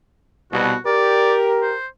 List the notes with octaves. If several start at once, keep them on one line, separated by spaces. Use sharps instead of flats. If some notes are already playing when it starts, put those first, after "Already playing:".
C2 B2 F#4
G4 A#4 D5
C5